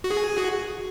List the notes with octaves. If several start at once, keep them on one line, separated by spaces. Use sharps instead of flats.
F#4
G#4
F#4